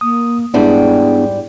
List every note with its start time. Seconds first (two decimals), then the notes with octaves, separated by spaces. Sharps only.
0.01 A#3 D#6
0.54 G#2 G3 B3 D4 E4 G#4 D5